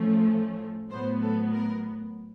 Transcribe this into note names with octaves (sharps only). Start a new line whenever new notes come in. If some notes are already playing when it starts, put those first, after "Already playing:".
Already playing: A2 F3 A3 C#4
A2 F#3 B3 C5
A4
A#4